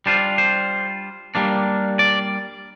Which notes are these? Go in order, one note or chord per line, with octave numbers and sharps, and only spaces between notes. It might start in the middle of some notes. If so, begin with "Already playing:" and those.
G3 D4 F4 C5
C5
G3 A#3 D4
D5